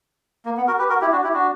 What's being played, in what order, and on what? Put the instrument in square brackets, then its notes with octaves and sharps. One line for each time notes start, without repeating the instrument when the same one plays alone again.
[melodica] A#3
B3
F#4 A#4
G4 B4
F#4 A#4
E4 G4
D4 F#4
E4 G4
D4 F#4